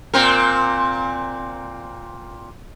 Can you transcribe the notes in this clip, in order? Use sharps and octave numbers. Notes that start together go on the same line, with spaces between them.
A#2 C4 A#4